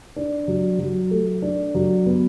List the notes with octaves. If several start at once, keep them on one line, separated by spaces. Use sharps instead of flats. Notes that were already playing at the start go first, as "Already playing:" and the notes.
D4
F#3
F#3
A3
D4
F#3
B3